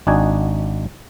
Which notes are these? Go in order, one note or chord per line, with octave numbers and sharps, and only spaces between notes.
G#1 D4 D#4 F#4 G#5